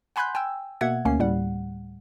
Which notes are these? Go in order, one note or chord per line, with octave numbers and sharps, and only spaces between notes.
F#5 G#5 B5 C6 F#6 G6
G5 G#5 E6
B2 A#3 E5 F#5 G#6
D2 A#3 C#4 C7
D2 A2 G3 F#5